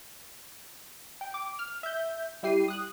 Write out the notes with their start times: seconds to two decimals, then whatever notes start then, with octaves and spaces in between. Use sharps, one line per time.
1.21 G5
1.34 D6
1.59 F6
1.83 E5 G6
2.43 G3 E4 G4 C7 D#7
2.68 D#6 F#6